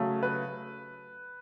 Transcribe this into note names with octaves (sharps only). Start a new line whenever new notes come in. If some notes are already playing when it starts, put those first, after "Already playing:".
Already playing: C#3 F#3 A3
B4